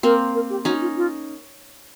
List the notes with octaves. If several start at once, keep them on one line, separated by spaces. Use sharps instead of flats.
A#3 C4 A#4
A#4
G4
C#4 D#4 F#4
F4
F4